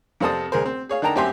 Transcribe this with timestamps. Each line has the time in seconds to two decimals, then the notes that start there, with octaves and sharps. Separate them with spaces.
0.20 F2 C3 C4 A4 A5 D#6
0.52 D2 G#4 A#4 C5
0.66 C4
0.89 G#4 C#5 F5
1.02 D3 D#4 A#4 G5 A5 A#5
1.16 F#2 C4 G4 E5 G#5 C6